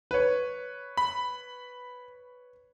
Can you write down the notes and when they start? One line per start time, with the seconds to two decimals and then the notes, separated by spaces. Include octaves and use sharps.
0.11 B4 C#5
0.97 B5